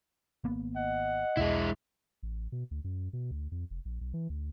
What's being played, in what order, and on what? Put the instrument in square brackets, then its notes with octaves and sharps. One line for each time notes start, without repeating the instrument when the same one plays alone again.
[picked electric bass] G#1 A#3 B3
[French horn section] D#5 [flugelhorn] F#5
[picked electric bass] B1 E2 E3 [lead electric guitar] G#3 E4
[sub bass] A1
B2
D2
F#2
B2
D2
F2
F1
A#1
B1
E3
D2